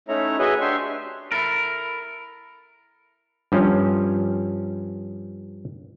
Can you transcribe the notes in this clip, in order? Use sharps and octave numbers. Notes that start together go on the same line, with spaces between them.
A3 C#4 D#4 E4 C#5 A#5
F#4 G#4 B4 C#5 D#5 E5
D4 G4 E5 C6 C#6
E4 A4 A#4
G2 F3 C#4